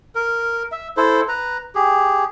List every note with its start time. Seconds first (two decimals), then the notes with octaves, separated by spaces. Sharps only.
0.15 A#4
0.72 E5
0.97 E4 A4 C5
1.29 B4 A#5
1.75 G4 G#4